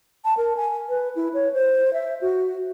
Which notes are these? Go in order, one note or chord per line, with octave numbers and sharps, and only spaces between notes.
A5
A#4
G#5
B4
E4
C#5
C5
E5
F#4